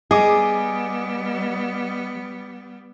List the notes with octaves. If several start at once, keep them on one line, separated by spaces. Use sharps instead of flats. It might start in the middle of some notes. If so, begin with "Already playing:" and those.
G3 B3 G#4 D#5 D6